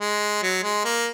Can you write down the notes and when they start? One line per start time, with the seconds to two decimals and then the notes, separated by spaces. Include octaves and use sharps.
0.01 G#3
0.43 F#3
0.63 G#3
0.85 A#3